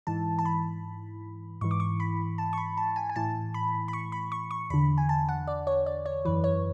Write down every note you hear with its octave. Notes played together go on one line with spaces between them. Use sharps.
G#2 E3 A5
A5
B5
G#2 E3 C#6
D6
C#6
B5
A5
C#6
B5
A5
G#5
G#5
A2 E3 A5
B5
B5
C#6
B5
C#6
C#6
E2 D3 B5
G#5
A5
F#5
D5
C#5
D5
C#5
F#2 E3 B4
C#5